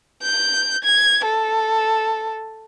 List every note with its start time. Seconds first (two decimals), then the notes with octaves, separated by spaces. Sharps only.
0.23 G6
0.84 G#6
1.24 A4